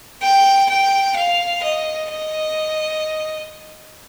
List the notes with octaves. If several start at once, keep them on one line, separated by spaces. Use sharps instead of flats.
G5
G5
F5
D#5
D#5